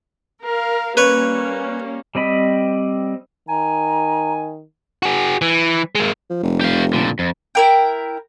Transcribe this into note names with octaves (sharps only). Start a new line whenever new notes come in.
A#4 F5
G3 A#3 C#4 B4 C#5
G3 C4 D#5 B5
D#3 G#5 A#5
F#4 G#4
E3
G#3 A#3
F3
F1
G4 F5
A#2 D3
F2
E4 A#4 G5